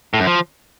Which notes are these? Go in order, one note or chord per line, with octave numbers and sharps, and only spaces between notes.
A2
F#2
F3